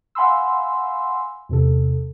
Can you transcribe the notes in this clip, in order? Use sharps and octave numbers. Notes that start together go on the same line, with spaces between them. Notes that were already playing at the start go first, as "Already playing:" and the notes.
F5 F#5 G#5 B5 C6 E6
E2 C3 A4